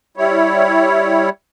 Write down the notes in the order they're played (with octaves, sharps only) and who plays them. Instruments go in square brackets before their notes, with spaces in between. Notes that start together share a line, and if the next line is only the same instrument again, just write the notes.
[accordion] G3 E4 C#5